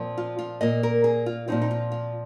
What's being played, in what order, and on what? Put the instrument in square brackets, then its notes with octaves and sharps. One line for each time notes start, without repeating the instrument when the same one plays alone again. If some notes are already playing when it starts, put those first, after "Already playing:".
Already playing: [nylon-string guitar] A#2 F3 C4
F4
F4
A#2 A#3 D#5
A#4
G#4
F4
A#2 F3 C4 D#4
D#4
F4
F4